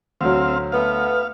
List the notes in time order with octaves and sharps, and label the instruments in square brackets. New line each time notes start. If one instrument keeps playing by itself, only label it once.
[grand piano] D2 F#3 [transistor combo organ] C4 F5
[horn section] A3 B3 [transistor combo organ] F5